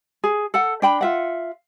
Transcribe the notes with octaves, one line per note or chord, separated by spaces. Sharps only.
G#4
A4 F#5
D4 G5 B5
F4 E5 F#5